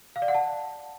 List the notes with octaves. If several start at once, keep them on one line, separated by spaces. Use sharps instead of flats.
F5
D5
F#5
A5